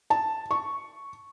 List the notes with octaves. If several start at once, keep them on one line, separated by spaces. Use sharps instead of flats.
A5
C#6